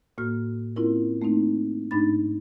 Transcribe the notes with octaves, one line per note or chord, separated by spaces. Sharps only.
A2 A#3 F#4 F6
A#3 C4 C#4 E4 F4 A#4
A3 A#3 C4 D#4
G#2 A3 D4 D#4 B5 A6